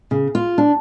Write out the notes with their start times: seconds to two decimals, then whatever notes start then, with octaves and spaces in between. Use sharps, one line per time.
0.11 C#3
0.35 F4
0.58 D4